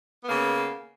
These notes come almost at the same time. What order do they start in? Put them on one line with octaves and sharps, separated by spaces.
B3 A#3 C#3